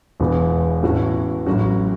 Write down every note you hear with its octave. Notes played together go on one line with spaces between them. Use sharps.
E1 E2 E3 B3
A2 E3 A3 C#4 F#4
A1 A2 F#3 C#4 F#4